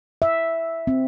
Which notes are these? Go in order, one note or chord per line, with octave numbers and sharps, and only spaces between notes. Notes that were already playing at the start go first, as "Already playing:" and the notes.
E5
C4